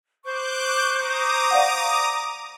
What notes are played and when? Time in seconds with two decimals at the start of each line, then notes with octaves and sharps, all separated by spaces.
0.24 C5 C#6 D6 F#6 G6
0.98 A#5 D6 D#6
1.51 D5 F5 F#5